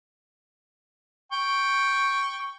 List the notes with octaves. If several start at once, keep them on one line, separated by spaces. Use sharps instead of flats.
G5 C#6